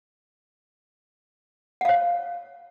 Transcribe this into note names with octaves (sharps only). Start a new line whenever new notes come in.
C#5 F5 F#5